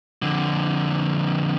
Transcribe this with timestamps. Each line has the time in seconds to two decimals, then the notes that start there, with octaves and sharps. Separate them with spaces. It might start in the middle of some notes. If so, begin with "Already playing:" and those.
0.22 F2 D3